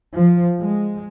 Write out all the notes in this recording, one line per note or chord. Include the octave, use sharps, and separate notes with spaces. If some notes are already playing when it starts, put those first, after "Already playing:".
F3
G#3